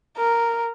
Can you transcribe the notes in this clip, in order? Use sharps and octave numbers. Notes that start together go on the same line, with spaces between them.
A#4